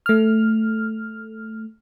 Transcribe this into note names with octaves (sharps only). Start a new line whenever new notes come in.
A3 F6